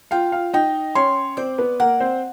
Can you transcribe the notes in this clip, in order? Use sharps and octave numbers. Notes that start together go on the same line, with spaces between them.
F4 F5 G5
F4 F5
D#4 D#5 G5
C#4 C#5 C6
C4 C5 D5
B3 B4
A#3 A#4 F#5
C4 C5